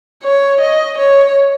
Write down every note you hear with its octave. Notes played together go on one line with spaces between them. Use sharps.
C#5
D#5
C#5